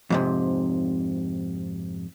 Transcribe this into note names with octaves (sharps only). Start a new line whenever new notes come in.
F2 G#2 C3